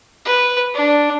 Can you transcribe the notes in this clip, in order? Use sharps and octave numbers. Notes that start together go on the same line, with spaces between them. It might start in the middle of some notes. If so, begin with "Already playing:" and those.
B4
D4